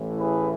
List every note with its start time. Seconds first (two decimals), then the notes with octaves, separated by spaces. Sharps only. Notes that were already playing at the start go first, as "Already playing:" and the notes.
Already playing: A1 A2 E3
0.18 G#4 B4